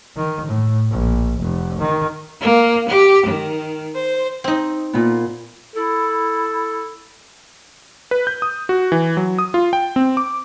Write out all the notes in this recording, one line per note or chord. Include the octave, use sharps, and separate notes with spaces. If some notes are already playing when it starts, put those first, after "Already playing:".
D#3
A2
A#1
F1
D#3
A#3
G4
D#3
C5
C4 D#4
A#2 B3
E4 A4
B4
G6
D#6
F#4
E3
F#3
D#6
F4
G5
C4
D6